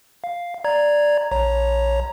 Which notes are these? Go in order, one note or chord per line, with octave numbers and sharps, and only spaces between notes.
F5
D5 A#5 G#6
A#1 C#5 A#5